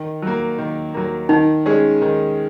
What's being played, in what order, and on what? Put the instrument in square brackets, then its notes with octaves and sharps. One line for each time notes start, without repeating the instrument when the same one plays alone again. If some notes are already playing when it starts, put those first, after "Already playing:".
Already playing: [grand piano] D#3
F#3 A#3
D#3
F#3 A#3
[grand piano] D#3 [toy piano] D#4
[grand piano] G#3 C#4 G#4
D#3